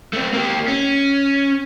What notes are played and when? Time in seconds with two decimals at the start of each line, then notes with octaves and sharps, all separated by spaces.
0.13 A3 C4
0.33 A#3 G4
0.68 C#4